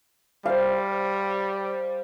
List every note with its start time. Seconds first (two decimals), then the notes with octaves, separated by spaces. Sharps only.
0.46 G3 C5 F5